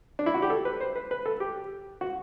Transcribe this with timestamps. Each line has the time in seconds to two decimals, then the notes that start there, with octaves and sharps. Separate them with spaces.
0.19 D4
0.26 E4
0.34 F#4
0.42 G4
0.50 A4
0.65 B4
0.80 C5
0.96 B4
1.11 B4
1.26 A4
1.40 G4
2.01 F#4